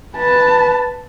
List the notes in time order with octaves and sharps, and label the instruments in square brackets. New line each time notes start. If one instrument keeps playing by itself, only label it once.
[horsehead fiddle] B4 A5